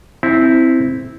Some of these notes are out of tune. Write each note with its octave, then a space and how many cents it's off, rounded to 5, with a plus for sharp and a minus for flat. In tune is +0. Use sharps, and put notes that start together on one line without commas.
C4 +0 E4 -10